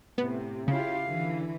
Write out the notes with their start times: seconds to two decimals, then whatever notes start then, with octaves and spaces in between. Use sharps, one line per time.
0.18 A2 C3 B3
0.68 C#3 E4 F4 G4 F5
1.04 D3 E3